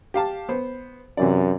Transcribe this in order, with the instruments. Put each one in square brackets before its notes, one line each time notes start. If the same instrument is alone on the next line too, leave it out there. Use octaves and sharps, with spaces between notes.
[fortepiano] G4 F5 A5
B3 C5
[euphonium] F#2 [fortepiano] C3 E3 D5